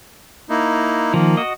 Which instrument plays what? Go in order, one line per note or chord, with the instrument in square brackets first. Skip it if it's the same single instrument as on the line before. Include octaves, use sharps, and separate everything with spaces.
[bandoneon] A#3 D#4 E4
[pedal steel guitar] D#3 F3 [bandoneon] A#3
[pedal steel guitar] F#4 D#5